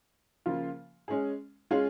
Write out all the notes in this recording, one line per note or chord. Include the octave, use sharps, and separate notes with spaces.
C#3 F3 A#3 F4
G#3 C#4 G#4
G#3 C#4 F4 G#4